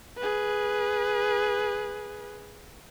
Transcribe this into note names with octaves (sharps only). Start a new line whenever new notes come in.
G#4 B4